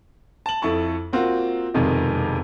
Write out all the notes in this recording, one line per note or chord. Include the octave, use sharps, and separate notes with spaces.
A5 F#7
F2 E4 A4 A5 C#6
A#3 C4 F4 F#4
E1 F2 C3 D#3 G#3